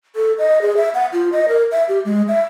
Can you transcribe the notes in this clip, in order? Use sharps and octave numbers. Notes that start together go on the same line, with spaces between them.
A4
D#5
G#4
E5
F#5
F4
D#5
A#4
E5
G4
G#3
E5